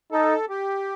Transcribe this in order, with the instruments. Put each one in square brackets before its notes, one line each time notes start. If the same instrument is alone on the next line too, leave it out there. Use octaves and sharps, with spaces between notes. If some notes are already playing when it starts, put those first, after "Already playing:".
[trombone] D#4 [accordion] A4
[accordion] G4